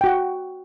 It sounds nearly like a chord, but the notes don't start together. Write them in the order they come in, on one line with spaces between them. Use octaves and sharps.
G5 F#4 F#5